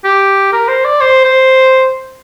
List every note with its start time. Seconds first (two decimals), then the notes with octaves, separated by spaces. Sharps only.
0.04 G4
0.53 A#4
0.68 C5
0.84 D5
1.01 C5
1.24 C5